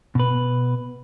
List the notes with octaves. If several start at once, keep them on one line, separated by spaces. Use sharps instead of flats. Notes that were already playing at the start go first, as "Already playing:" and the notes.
B2 B4